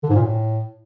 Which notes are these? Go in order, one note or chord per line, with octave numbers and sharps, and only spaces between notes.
D3
G#2
A#2
A2